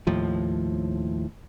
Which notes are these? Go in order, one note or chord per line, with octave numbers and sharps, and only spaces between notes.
D#2 A2 F3